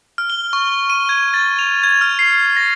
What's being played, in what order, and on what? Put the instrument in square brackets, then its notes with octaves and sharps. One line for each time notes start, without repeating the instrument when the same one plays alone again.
[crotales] F6
G7
C#6
D#7
G#6
A6
F7
G#6
F6
C7
C7
A#6